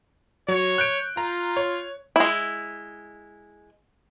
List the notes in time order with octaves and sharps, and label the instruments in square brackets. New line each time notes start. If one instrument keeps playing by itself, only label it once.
[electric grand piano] F#3 [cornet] C#5
[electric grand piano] F#6 G6 D7
[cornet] F4 [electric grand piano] A#5
[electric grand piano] C#5
[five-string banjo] G#3 E4